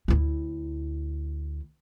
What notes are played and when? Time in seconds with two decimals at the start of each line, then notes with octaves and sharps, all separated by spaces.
0.08 D2 E4